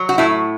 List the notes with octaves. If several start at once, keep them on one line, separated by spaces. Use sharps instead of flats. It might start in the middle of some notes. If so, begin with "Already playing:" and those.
Already playing: F#3
F#4
A2 E4